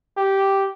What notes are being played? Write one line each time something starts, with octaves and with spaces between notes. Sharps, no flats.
G4